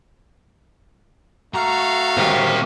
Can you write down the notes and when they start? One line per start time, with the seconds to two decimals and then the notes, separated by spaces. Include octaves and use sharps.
1.55 A3 F#4 F5 A#5
2.18 A#2 G4 C5 A#5